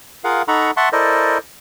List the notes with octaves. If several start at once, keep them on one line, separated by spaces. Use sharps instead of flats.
F4 G#4 A#4 F5 F#5
D#4 A4 F#5 A#5 B5 C#6
E5 F#5 A5 C6 C#6
E4 A4 A#4 C5 D5 D#5